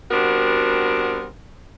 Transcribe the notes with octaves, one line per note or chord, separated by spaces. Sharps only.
G3 B3 C4 D4 F#4 A#4